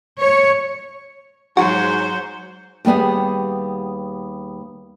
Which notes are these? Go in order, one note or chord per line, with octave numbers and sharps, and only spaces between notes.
C#5
G#2 F#3 F#4 C5
D#2 G3 B3 G#4 F#5